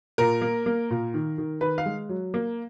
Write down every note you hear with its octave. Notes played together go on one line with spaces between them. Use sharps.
A#2 A#4
A#3
A#3
A#2
D#3
D#3
D#3 B4
F5
G#3
F#3
A#3